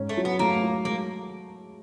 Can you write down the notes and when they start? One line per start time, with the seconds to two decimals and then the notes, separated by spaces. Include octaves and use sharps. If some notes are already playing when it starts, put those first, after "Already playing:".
Already playing: G#2 C#4
0.09 A3
0.17 F#3
0.25 B3
0.39 A3 A#3
0.63 F#3
0.85 G#3 A#3